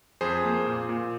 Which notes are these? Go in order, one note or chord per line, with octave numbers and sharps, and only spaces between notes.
F2 G#4 C5
A#3
A#2
A#2